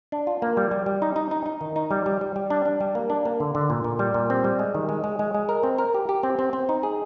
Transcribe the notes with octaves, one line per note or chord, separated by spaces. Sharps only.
D4
F4
A#3
G3
G3
G3
D#4
D#4
D#4
D#4
D#3
D#4
G3
G3
G3
G3
D4
D4
G3
A#3
D4
A#3
D3
D3
A#2
A#2
G3
A#2
C4
G3
G#3
D#3
G#3
G#3
G#3
G#3
A#4
C4
A#4
G4
G4
C4
C4
C4
D#4
G#4